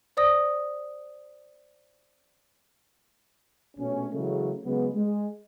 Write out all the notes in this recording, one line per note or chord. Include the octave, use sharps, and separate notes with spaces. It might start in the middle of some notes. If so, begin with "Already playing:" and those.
C5 D5 D#6 A#6
A#1 B2 A3 C#4
C#3 E3 F#3 G#3 A3
C#3 F#3 G#3 B3
G#3